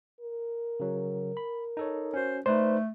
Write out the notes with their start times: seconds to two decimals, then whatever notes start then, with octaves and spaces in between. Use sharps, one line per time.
0.21 A#4
0.80 C#3 F#3
1.37 B5
1.77 D#4 A4 C#5
2.14 C#4 F#4 C5
2.46 A3 D#4 B4 C5 D5